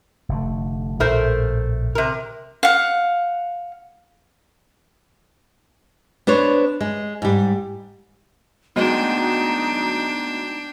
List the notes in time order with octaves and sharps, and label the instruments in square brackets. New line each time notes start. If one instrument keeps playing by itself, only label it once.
[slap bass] F1 D3 A3
[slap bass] A#1 A2 [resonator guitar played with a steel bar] A3 A#4 C5
[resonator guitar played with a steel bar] C3 A#4
[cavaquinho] F5 F#5
[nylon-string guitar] B3 D4 C5 C#5
G#3
G#2 G3
[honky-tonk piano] D2 F#3 G#3 [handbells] B3 [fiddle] D4 G5 [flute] D#4